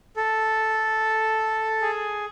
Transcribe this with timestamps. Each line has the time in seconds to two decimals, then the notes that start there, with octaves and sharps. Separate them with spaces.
0.16 A4
1.82 G#4